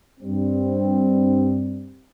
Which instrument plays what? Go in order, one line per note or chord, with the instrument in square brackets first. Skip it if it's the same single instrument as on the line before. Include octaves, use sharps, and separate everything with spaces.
[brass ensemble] G2 G3 C4